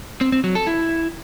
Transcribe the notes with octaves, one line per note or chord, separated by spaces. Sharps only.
C4
C4
F#3
A4
E4